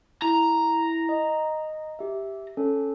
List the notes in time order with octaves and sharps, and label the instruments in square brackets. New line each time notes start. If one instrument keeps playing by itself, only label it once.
[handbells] E4 [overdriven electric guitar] A#5
[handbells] D#5
G4 E5
C#4 A4